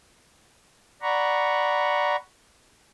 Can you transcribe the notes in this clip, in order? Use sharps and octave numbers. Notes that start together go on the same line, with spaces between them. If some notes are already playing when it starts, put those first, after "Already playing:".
D5 F#5 A#5 B5 C#6